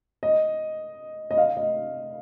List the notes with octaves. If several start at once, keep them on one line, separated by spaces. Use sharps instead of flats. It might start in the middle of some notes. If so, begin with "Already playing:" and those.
D#5
D#5
F5
D#5